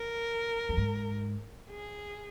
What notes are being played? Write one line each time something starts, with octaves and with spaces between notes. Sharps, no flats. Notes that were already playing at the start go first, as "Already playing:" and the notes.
Already playing: A#4
F2
G#2
G#4